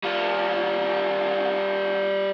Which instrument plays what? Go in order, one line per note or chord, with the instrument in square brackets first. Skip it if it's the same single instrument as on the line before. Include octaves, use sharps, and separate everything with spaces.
[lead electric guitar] G3 F4